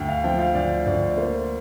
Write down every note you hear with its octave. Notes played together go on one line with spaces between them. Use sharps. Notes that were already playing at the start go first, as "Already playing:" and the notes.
Already playing: D2 G5
F5
F3 G5
F5
D2 D5
D2 D5
D5
A#3 C5